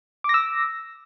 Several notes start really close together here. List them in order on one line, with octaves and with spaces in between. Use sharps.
D6 A#6 E6